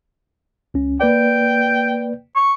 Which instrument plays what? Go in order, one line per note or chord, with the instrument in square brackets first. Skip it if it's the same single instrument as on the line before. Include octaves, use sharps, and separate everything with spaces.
[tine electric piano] C#2 C#4
[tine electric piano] A#3 B4 D5 [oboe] G5
[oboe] C#6